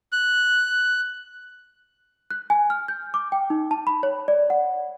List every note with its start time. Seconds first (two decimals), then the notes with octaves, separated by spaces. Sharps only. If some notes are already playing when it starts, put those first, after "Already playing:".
0.12 F#6
2.30 F#6
2.50 G#5
2.70 F6
2.88 G6
3.14 D6
3.32 G5
3.50 D#4
3.71 A5
3.87 B5
4.03 C#5
4.28 D5
4.50 F#5